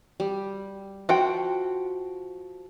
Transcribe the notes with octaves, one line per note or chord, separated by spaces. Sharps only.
G3
F3 F#4 F#5 G5